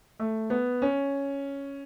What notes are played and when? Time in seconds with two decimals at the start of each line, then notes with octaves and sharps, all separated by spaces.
0.20 A3
0.50 B3
0.82 C#4